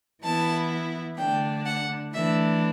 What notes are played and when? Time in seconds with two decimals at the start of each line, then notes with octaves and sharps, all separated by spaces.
0.23 E3 B3 E4 A5
1.18 D3 A3 D4 G5
1.66 F#5
2.14 E3 A3 D4 E5